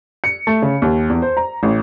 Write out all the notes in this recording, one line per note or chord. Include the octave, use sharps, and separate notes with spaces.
C#7
A3
C#3
D#2
E2
C5
A#5
A1